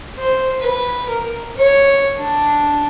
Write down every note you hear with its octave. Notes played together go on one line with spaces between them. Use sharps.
C5
B4
A#4
C#5
D4